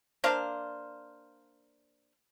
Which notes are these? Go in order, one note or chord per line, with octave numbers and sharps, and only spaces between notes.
A#3 D4 C5 F5